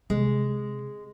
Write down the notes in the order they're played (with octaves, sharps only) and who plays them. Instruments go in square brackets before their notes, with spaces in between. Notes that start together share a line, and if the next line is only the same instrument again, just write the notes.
[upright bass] C3 [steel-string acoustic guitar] G#3